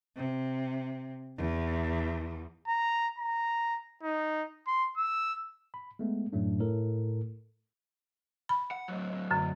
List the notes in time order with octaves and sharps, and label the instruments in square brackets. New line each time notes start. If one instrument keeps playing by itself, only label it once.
[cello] C3
E2
[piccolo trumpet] A#5
A#5
D#4
C6
E6
[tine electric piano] B5
G#3 A3 B3
F#2 A2 F#3 A3 D4
A2 A4 A#4
[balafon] B5
[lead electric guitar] F#5
A2 F#3
[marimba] F#2 D3